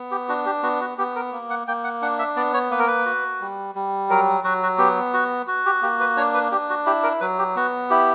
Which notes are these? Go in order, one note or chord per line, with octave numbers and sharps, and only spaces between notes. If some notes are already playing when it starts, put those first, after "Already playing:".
Already playing: B3
G4
D4 F#4
G4
B3 F#4
F#4
B3 G4
A#4
A#3
F#5
A#3 G5
F#5
D4 F#5
E5
B3 D5
C#5
A#3 B4
A#4
B4
F#4
G3
G3
F#3 A#4
F#3 F#4
F#4
B3 G4
F#4
F#4
G4
A#3 G4
B4
D4 C#5
B4
D4 G4
F#4
E4 G4
A#4
F#3 B4
G4
B3 F#4
E4 G4